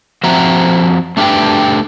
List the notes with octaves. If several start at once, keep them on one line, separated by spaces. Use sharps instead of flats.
F3 C4 F#4 E5 A#5
A3 D4 F#4 G4 B4 G5